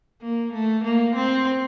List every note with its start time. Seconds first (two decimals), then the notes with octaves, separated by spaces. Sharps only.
0.22 A#3
0.53 A3
0.84 A#3
1.15 C4